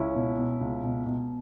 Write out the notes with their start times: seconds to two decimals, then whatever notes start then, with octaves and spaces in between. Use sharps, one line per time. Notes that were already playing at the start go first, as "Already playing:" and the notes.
Already playing: C#2 C#4 E4
0.15 B2
0.38 B2
0.61 C#2
0.84 B2
1.06 B2